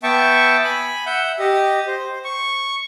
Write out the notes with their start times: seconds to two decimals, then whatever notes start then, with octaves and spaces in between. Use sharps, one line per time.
0.03 B3 E5 G5 A5 C#6
0.64 G#5 B5
1.06 E5 F#5 G6
1.39 G4 D#5
1.87 C5
2.24 C#6